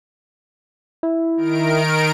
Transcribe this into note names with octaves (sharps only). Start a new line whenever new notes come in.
E4
D#3 A#4 D7